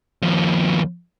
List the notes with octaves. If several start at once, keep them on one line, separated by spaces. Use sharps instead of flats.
D#2 F3